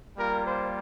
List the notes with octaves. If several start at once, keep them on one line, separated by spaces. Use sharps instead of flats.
G3 A#3 F4 A#4
C5